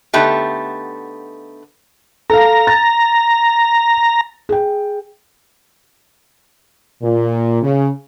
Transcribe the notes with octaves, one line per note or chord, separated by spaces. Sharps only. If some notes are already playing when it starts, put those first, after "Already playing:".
D3 A3 B3 D#4 G4
A4 F5 A#5
A6
G#4 G5
A#2
C#3